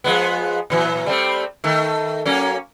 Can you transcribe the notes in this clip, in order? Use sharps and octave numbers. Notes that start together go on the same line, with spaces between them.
F3 G#3 B3
A#2 E3 F#3
G3 A3 C4
D#3 A3
F#3 A#3 C#4